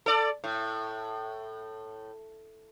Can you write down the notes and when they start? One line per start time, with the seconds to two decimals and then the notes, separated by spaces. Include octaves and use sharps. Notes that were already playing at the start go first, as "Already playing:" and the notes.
0.06 A4 D5
0.44 A2